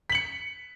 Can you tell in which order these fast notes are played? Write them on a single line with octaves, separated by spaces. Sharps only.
B6 F#7 C#7